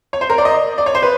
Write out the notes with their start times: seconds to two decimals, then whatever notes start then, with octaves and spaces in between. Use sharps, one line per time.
0.13 C#5
0.21 C5
0.30 A#4
0.38 D5
0.45 D#5
0.78 D5
0.86 C#5
0.95 C5
1.02 B4